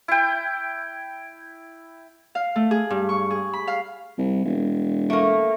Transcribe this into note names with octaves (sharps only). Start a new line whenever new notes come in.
E4 G5
F5
A3
G#4
G2
C#6
G#4
B5
F5
C2
E1
A3 A#3